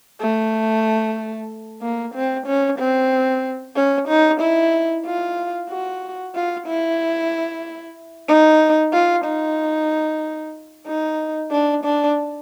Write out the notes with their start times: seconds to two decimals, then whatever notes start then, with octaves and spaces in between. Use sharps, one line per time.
0.20 A3
1.82 A#3
2.14 C4
2.47 C#4
2.78 C4
3.76 C#4
4.09 D#4
4.40 E4
5.06 F4
5.69 F#4
6.35 F4
6.67 E4
8.28 D#4
8.93 F4
9.25 D#4
10.87 D#4
11.51 D4
11.84 D4